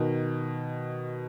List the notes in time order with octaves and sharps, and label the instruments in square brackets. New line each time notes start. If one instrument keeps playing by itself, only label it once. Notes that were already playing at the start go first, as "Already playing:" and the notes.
Already playing: [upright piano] B2 D#3